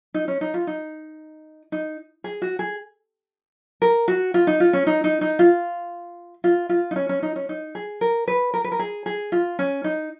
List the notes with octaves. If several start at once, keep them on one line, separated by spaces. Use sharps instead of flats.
D#4
C#4
D#4
F4
D#4
D#4
G#4
F#4
G#4
A#4
F#4
F4
D#4
F4
C#4
D#4
D#4
D#4
F4
F4
F4
D#4
C#4
C#4
D#4
C#4
D#4
G#4
A#4
B4
A#4
B4
A#4
G#4
G#4
F4
C#4
D#4